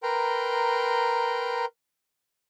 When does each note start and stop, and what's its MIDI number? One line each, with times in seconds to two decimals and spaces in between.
0.03 1.65 70
0.03 1.65 71
0.03 1.65 79
0.03 1.65 82
0.03 1.65 84